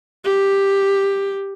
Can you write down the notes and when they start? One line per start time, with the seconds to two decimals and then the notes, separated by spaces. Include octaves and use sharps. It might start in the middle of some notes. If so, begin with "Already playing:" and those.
0.25 G4